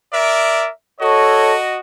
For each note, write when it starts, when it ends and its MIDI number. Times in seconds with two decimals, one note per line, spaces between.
0.11 0.68 70
0.11 0.68 74
0.11 0.68 76
1.01 1.78 66
1.01 1.55 69
1.01 1.55 73
1.01 1.78 75